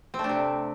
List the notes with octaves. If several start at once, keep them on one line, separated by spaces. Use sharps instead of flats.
C4
A3
D4
C3